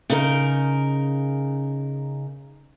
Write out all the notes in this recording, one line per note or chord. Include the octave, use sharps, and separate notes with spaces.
C#3 D#4 A#4